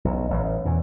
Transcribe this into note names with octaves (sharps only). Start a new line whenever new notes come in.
B1
A1
E2 B2 E3